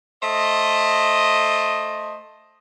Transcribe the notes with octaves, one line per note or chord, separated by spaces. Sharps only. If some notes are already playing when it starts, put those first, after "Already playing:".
A3 C5 D#5